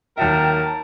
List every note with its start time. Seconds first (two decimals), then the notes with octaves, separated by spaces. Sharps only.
0.18 D#2 F#3 A#4 E5 G5 A5